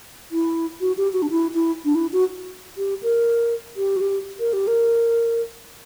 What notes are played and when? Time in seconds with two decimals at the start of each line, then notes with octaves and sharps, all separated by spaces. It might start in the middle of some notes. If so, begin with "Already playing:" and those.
0.32 E4
0.81 F#4
0.97 G4
1.13 F#4
1.22 D4
1.30 E4
1.54 E4
1.85 D4
1.95 E4
2.13 F#4
2.78 G4
3.03 A#4
3.76 G4
3.96 F#4
4.01 G4
4.40 A#4
4.53 G4
4.67 A#4